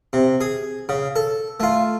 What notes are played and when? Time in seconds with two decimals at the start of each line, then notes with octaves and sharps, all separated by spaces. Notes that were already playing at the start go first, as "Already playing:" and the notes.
0.13 C3
0.41 G#4
0.89 C#3
1.16 A4
1.60 A3 F4